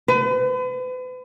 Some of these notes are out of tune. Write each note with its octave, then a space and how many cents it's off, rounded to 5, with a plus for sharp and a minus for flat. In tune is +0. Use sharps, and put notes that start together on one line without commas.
B4 +40